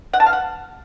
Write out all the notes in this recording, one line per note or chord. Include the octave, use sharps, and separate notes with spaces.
F#5
A5
F5
F#5